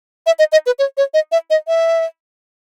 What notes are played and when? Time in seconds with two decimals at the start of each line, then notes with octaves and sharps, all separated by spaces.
0.26 E5
0.39 D#5
0.52 D#5
0.66 B4
0.79 C#5
0.97 C#5
1.14 D#5
1.32 E5
1.50 D#5
1.68 E5